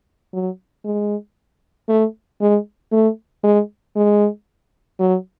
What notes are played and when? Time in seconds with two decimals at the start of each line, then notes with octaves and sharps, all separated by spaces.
0.34 F#3
0.85 G#3
1.89 A3
2.41 G#3
2.92 A3
3.44 G#3
3.96 G#3
5.00 F#3